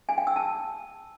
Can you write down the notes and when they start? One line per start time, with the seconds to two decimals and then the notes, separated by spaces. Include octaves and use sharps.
0.09 G#5
0.18 G5
0.27 E6
0.36 A5